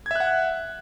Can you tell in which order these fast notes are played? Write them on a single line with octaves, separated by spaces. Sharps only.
G#6 E5 F#6 F#5